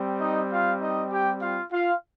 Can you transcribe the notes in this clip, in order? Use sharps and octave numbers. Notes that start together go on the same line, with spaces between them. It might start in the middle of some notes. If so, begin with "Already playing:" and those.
Already playing: G3 C4
D#4 D#5
F4 F5
D#4 D#5
G4 G5
F4 F5
F4 F5